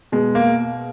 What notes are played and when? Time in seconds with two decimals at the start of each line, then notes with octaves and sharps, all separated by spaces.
0.12 B2 G#3
0.35 A#3